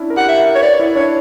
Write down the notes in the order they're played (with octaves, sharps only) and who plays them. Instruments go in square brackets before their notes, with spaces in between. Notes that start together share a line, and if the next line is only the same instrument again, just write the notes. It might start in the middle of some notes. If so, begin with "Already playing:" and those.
Already playing: [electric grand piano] C#4 D4 E4
A#4
[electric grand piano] G4 [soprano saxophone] F#5
[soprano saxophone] E5
[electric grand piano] A#4
[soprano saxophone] C#5
[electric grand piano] B4 [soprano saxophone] D5
[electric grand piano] E4
[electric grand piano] D4 [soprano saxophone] C#5